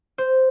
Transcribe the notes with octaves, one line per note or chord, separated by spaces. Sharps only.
C5